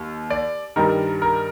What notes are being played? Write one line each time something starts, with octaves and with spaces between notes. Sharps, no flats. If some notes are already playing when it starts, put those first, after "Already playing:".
Already playing: D#2
D5
G2 D#3 G3 A#4
A#4